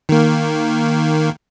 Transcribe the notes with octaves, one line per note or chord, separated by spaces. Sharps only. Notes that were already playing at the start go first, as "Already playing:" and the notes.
D#3 A#3